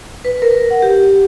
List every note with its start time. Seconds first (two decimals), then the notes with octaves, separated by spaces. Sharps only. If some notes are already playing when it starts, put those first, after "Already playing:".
0.25 B4
0.42 A#4
0.70 F#5
0.82 G4